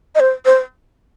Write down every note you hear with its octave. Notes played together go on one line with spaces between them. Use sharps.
D#5
C5
C5